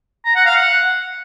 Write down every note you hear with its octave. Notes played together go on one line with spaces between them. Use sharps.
A#5
F#5
F5
F#5